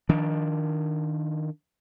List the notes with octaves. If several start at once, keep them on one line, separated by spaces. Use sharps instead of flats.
D#3 F3 D4